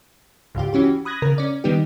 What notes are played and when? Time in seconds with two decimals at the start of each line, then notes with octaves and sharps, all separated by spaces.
0.55 G#1 C#2 F4 G4
0.73 E3 C#4 F#4 G4
1.05 B5 D#6 F#6 G#6 A#6
1.22 C#3 A#4
1.38 C#4 D5
1.64 D#3 G3 B3 D#4 G4